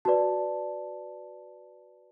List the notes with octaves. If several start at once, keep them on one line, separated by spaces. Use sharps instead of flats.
F#4 B4 D5 A5